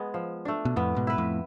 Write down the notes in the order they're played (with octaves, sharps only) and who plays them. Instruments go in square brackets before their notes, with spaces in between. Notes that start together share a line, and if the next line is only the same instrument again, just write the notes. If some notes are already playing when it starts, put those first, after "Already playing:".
Already playing: [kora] G#3 B3
F3
A3 D4
[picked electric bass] B2
[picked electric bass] F2 A2 [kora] B3
[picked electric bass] G#2 B2
[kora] E4 B4
[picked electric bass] F2 A2